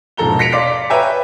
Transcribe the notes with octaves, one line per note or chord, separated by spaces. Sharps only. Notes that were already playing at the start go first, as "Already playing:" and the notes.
E1 G#2 F3 A4 A#5 G7
A#6 B6 C#7 D7 F7
D5 F5 C6 D6 B6
B4 C#5 E5 G5 G#5 A#5